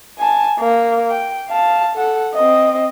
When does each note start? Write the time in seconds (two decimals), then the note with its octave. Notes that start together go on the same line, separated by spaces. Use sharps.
0.19 G#5 A5
0.59 A#3
1.10 G5
1.49 F5 A5
1.96 A4 F#5
2.34 C4 D#5